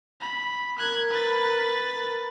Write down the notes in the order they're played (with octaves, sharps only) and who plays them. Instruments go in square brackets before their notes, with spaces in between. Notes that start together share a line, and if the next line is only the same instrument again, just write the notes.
[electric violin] B5
[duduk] A#4 [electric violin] F#6 G#6
[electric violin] B4 A6
[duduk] A#4